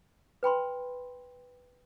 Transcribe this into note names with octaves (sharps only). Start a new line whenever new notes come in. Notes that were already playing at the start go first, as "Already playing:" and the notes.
B4 G5 B5 C6